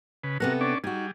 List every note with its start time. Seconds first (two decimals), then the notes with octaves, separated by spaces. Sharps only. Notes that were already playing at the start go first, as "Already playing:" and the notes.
0.24 C#3 B4
0.40 C3 B3 F#4 A4 A#4
0.61 C#4 D4 D5
0.84 G3 D#4 F#4 G#4